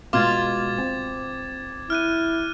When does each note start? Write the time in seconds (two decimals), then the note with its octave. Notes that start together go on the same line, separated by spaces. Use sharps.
0.13 B2 G#3 F4 D6 G#6 A6
0.78 C4
1.90 E4 F6 F#6 D#7